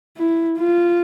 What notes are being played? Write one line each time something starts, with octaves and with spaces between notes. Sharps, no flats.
E4
F4